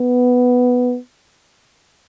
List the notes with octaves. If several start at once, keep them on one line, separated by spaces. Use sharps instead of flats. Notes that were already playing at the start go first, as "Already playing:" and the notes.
Already playing: B3